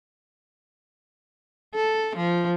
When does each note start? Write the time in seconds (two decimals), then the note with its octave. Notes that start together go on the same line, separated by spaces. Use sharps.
1.75 A4
2.16 F3